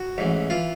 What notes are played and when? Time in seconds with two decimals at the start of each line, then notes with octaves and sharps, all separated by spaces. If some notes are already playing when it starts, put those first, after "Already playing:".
Already playing: F#4
0.18 A1 G#2 E3
0.50 E3 F4